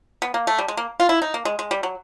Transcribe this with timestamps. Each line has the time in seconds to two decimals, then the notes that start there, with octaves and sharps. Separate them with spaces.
0.22 B3
0.34 A#3
0.47 A3
0.58 G3
0.68 G#3
0.77 A#3
1.00 F4
1.09 E4
1.22 D#4
1.34 A#3
1.45 G#3
1.59 G#3
1.71 G3
1.83 F#3